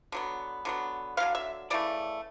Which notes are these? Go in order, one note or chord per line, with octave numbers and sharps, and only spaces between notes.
D3 F#3 B3
D3 F#3 B3
D3 F#3 B3 F5
E5
C#3 E3 A3 D5